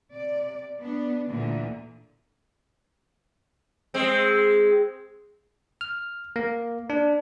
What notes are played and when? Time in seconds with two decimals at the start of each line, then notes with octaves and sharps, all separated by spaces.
0.13 C3 D5
0.80 B3 D4
1.29 D2 A#2 D3 E3 A#3
3.94 G#3 C4
5.81 F6
6.36 A#3
6.90 D4